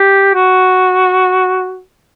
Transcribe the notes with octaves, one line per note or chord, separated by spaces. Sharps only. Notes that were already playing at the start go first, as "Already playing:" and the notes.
Already playing: G4
F#4